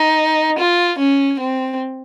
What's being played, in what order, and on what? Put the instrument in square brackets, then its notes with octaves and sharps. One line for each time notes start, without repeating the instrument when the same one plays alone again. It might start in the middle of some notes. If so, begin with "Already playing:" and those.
Already playing: [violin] D#4
F4
C#4
C4